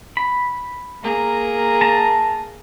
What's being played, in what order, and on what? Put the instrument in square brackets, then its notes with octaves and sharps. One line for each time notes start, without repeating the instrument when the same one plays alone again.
[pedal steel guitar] B5
[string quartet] A#3 G#4 A#4
[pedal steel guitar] A5 A#5